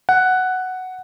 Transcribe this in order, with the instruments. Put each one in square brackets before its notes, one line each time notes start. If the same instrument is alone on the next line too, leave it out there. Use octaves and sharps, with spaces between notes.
[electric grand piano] F#5